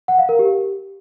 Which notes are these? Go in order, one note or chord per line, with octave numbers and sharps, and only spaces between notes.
F#5
F5
A#4
G4